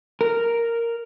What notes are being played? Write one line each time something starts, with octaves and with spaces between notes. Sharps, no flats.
A#4